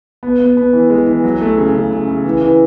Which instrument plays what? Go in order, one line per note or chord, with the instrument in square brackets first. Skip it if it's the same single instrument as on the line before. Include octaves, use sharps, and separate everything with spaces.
[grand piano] B3
B3
B3
E3
G#3
E3
F#3
A3
C#3
C#3
C#3
C#3
E3
E3